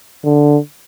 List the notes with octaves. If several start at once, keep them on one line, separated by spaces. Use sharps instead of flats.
D3